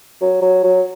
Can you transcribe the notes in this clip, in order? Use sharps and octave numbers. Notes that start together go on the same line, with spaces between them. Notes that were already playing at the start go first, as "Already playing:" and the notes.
F#3
F#3
F#3